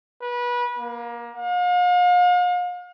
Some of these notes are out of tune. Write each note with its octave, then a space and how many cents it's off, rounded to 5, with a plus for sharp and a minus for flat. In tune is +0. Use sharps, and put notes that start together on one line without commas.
B4 -25
A#3 +25
F5 +40